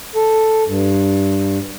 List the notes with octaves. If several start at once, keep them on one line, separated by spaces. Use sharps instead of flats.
A4
G2